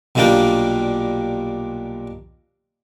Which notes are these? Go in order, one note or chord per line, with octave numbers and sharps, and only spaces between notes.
B1 A#2 G3 A#3 D4 G5